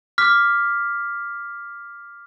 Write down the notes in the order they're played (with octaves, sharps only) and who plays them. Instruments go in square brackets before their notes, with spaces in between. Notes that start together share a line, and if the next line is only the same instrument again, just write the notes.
[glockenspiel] D6 F6 B6